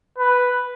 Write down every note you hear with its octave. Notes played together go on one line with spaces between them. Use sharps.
B4